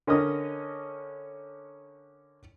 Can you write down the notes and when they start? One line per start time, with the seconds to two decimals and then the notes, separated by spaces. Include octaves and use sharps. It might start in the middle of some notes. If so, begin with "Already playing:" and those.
0.07 D3 C#4 A#4 D#5 D#6